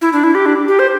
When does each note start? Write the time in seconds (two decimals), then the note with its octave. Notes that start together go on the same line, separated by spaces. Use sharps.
0.02 E4
0.13 D4
0.24 E4
0.35 G4
0.46 D4
0.68 G4
0.79 C5